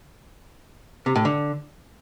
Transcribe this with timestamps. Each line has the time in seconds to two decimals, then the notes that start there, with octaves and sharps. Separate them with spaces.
1.06 C3
1.16 A2
1.25 D3